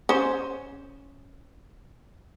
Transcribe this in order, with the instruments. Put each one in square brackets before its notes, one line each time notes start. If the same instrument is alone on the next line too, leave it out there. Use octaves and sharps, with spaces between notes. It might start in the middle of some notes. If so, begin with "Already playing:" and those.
[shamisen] C#4 C5